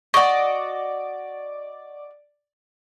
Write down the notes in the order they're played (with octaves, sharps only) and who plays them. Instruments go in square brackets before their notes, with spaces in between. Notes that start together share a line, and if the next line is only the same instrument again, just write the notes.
[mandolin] F#4 D#5 [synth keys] D5 D6 [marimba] C#6